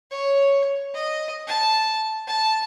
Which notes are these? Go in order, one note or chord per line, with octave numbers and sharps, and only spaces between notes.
C#5
D#5
A5
A5